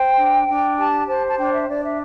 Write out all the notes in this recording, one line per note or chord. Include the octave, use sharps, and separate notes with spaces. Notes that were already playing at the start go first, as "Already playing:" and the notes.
Already playing: C5 G5
D4
D4
G4 A5
C5 A5
A5
D4 G5
E5
D4 D5
E5